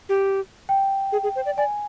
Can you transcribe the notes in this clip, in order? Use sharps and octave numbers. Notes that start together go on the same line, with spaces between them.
G4
G5
G#4
G#4
C5
D5
D5 G#5